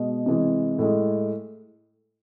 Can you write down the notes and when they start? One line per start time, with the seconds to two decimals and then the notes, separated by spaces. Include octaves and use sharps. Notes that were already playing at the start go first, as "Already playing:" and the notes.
Already playing: B2 G#3
0.26 C3 E3 G#3
0.79 A2 G#3